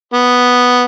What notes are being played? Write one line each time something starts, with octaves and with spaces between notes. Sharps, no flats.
B3